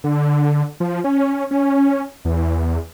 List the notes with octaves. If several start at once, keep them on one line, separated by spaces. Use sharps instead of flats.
D3
F3
C#4
C#4
E2